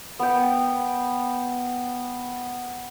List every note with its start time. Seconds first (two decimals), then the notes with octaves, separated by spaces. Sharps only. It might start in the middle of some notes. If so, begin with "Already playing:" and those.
0.19 B3 G5